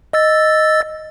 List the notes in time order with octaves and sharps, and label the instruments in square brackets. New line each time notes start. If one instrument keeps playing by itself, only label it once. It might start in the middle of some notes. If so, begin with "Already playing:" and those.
[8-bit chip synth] D#5 E6 A6